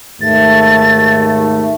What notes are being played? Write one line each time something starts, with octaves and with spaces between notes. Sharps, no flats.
D#2 G#2 A3 A6